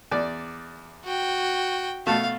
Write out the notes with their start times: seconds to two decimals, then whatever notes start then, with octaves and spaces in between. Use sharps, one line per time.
0.11 E2 D5
1.05 F#4 G5
2.07 B2 A3 F5 A5